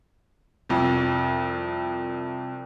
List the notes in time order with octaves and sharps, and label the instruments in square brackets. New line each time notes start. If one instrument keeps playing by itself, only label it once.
[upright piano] C2 F2